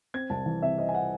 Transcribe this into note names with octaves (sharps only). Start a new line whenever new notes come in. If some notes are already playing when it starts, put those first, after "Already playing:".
C4 G#6
C2 A5
E3
C3 E5
C4 D#5
G#5
F#5